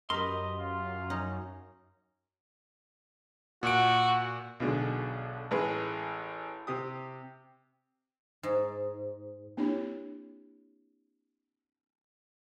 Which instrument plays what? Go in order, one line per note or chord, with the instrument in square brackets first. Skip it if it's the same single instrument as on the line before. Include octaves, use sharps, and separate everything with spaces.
[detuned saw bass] F#2 [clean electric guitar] G4 C6 [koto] A#4 B4 [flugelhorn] D#5
[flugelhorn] F4
[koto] C#4 D#4
[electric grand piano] A#2 D7 [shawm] F#4
[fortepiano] B1 B2 D3 G#3
A1 G#3 G#4 B4
C3 G4 D#6
[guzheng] G#2
[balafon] A#3 C4 D4 E4 G4 C#5